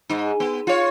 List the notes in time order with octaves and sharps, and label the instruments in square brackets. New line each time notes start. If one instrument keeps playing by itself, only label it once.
[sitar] G#2 D#4
B3
F4 C#5